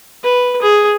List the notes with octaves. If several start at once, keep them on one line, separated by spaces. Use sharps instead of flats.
B4
G#4